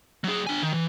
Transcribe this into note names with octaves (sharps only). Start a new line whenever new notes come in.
F#3 G#4
D4 G#5
D#3
E3